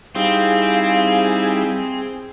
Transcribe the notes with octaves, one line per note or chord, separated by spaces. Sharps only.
G3 C4 D#4 E4 G#4 F5